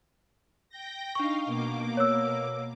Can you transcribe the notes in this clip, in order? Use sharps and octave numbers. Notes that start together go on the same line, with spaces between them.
G5 G6 A#6
D4 D#4 F5 C#6
B2 A#3 D6
C#5 E6